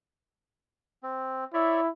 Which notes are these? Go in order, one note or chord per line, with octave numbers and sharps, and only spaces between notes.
C4
E4 C#5 D5 E5